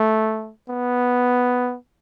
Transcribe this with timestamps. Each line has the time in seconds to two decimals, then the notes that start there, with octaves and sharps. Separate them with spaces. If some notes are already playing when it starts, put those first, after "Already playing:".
Already playing: A3
0.69 B3